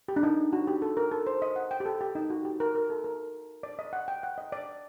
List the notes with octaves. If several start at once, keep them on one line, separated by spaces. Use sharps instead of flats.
G4
D4
D#4
F#4
G4
A4
A#4
A4
C5
D#5
F#5
G5
G4
A4
G4
D#4
F#4
G4
A#4
A#4
A4
A#4
D5
D#5
F#5
G5
F#5
D#5
D5